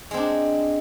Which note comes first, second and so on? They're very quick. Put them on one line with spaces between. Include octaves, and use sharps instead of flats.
G#3 C4 D4